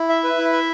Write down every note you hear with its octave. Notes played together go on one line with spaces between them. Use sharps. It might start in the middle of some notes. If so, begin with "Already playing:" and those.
Already playing: E4
E5
B4
E4
E5